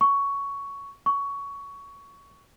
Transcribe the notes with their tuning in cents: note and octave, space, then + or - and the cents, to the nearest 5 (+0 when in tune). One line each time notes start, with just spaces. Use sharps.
C#6 +10
C#6 +15